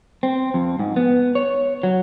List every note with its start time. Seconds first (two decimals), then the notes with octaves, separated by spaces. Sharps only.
0.23 C4
0.54 F2
0.79 G#2
0.96 B3
1.35 C#5
1.83 F#3